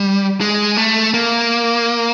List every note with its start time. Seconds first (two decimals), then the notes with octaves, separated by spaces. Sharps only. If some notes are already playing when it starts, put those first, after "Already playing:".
Already playing: G3
0.41 G#3
0.77 A3
1.14 A#3